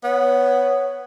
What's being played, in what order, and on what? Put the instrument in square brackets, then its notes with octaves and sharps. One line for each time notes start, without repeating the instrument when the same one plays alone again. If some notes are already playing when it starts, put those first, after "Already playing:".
[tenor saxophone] B3 [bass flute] C#5